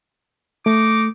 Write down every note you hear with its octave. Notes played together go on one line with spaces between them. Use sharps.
A3 D#4 D6